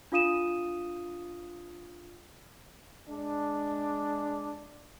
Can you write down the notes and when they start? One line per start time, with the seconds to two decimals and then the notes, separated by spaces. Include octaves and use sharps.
0.12 D4 F4 F5 D#6 D#7 E7
3.09 G#3 D4